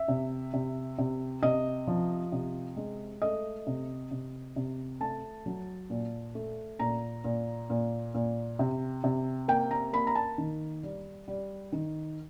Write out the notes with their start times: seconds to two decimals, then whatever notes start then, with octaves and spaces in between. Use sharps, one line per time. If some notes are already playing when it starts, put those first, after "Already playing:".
Already playing: E5
0.08 C3
0.53 C3
0.98 C3
1.42 C3 D#5
1.87 F3
2.32 C3
2.77 G#3
3.22 A3 D#5
3.67 C3
4.11 C3
4.56 C3
5.00 A3 A5
5.46 F#3
5.90 A#2
6.35 A3
6.79 A#2 A#5
7.24 A#2
7.70 A#2
8.14 A#2
8.59 C3
9.04 C3
9.48 A#3 G5
9.71 A#5
9.93 A#3 B5
10.07 A#5
10.15 A5
10.38 D#3
10.83 G3
11.28 G3
11.72 D#3